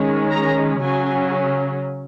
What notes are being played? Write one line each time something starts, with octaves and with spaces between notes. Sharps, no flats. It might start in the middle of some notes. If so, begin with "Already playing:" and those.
Already playing: D#3 G#3 C#4
A#5
C#3 F#3 C#4 G#5